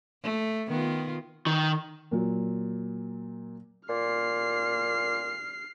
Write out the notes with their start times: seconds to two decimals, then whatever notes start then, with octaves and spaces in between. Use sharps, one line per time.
0.23 A3
0.69 D#3 B3 F4
1.46 D#3
2.11 A#2 F#3
3.89 A#2 F6 C7